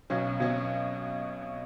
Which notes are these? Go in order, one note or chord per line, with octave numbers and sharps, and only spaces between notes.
B1 B2 F#3 C#4
B1 B2 F#3 C#4